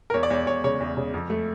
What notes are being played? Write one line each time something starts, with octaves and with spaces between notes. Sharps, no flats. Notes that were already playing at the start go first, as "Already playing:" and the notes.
A#4
E2 C#5
D5
E2 C#5
E2 C#5
C#3 C#5
E2
C#3
F2
A3